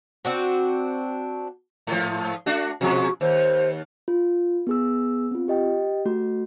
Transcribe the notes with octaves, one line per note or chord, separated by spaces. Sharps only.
C4 D4 F#4
G#2 F3
A3 D4 F#4
B2 F3 G#3 F#4
D#2 C5
F4
B3 G#4 E6
C4 F4
G4 D#5 G5
A3 F#4